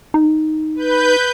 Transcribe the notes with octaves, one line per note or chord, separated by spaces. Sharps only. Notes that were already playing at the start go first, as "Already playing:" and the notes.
D#4
B4 G6